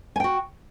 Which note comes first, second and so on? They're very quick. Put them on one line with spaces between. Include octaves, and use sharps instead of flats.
G#5 G5 F#4